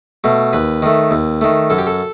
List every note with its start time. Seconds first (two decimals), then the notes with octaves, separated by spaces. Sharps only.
0.24 B2 A3
0.53 D#2 B4
0.82 D#3 A3
1.11 D#2
1.41 D#3 A3
1.70 F#2 A4
1.78 G4
1.87 A4